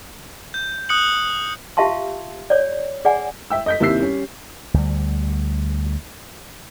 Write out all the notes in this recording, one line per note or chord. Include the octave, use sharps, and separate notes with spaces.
G6
D#6 F#6 C#7 F#7
F4 G4 E5 F5 A5 C6
C#5 D5
G#4 D5 F#5 G#5
E5 G5 E6
D#5 G6 B6
D#2 C3 E4 E6 C7
G3 C#4
D2 G3